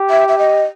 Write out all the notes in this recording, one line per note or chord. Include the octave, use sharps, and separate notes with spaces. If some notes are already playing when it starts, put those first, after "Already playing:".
Already playing: G4
E5
E5
D#5